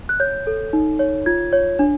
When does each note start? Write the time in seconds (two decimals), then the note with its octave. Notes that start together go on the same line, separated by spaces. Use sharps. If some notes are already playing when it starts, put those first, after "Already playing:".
0.09 F#6
0.20 C#5 G6
0.47 A4
0.73 D#4
0.99 C#5
1.26 F4 G#6
1.53 C#5
1.79 D4